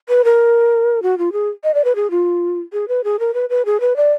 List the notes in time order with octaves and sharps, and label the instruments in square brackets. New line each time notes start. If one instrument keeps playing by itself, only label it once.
[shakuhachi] B4
A#4
F#4
F4
G#4
D#5
D5
B4
G#4
F4
G#4
B4
G#4
A#4
B4
B4
G#4
B4
D5